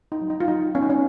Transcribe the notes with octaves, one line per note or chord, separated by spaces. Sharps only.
D#4
F#3
D#4
F4
F#3 D#4
B3 C#4
D#4
C#4